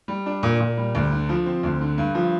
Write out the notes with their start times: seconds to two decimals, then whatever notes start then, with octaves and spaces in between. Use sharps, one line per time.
0.08 G3
0.26 D4
0.43 A#2
0.60 A#2
0.77 G3
0.95 D2
1.12 D3
1.29 F3
1.46 C4
1.63 D2
1.81 D3
1.98 G2
2.15 F3